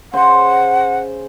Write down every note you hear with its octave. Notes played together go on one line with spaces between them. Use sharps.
C#3 C5 F#5